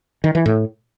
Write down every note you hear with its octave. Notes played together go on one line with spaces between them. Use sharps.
D#3
E3
A2